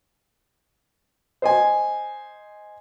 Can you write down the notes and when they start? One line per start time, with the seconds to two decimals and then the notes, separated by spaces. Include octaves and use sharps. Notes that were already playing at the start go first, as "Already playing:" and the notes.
1.42 C5 D#5 G#5